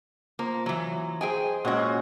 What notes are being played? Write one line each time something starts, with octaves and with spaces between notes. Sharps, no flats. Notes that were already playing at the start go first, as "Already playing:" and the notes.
F3 A#3
E3 F#3
G#4 C5 D#5 G5 G#5
A#2 F#3 G#3 C#4 F#4